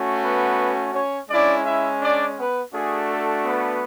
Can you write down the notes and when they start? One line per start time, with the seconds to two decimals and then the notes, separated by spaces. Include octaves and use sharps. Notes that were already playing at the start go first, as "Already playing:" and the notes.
Already playing: A3 C#4 F#4
0.22 B3 B4
0.93 C#4 C#5
1.29 G#3 C#4 D4 E4 D5
1.65 E4 E5
2.01 D4 D5
2.37 B3 B4
2.72 A3 D4 F#4 G#4
3.08 A4
3.44 B3 B4